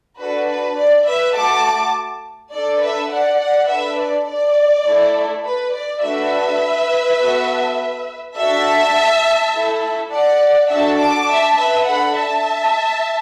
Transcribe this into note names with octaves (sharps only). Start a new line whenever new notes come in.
D4 F#4 A4 B4
B4
D5
B4 E5
A3 F#4 A4 A5 D6
D4 A4 D5
B4 E5
D5 F#5
D5 F#5
D4 A4 B4 E5
D5
D5
A3 E4 A4
B4
D5
A3 D4 F#4 A4 B4 E5
B3 F#4 A4
D4 F#4 A4 E5 A5
A3 E4 A4
D5 F#5
D4 F#4 A4 E5 A5
A5 D6
E5 A5
B4 E5
D4 A4 F#5 B5
E5 A5